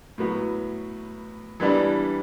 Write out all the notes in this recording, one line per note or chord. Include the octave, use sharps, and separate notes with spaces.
A2 F#3 B3
E3 G3 B3 D4